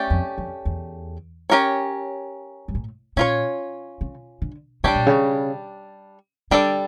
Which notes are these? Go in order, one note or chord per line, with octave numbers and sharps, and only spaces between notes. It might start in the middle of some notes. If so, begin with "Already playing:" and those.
Already playing: A3 C#4 G4 D5
F2
F2
E2
C#4 G4 A#4 C#5
G2
A2
A#2 C#4 F4 C#5
C#3
D3
C#3 G3 D4 G4 C#5
A#2
C#3
D3 G3 D4 A4 D5